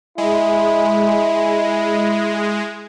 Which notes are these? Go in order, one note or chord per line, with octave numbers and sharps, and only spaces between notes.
G#3 E4